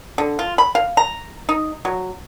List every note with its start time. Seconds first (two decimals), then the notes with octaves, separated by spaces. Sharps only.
0.18 D3
0.39 F4
0.58 B5
0.75 F5
0.97 A#5
1.49 D#4
1.85 F#3